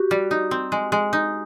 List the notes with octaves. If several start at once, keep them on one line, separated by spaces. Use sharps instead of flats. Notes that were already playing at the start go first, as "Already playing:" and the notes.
Already playing: F#4 G4
G3
D#4
C4
G#3
G#3
D#4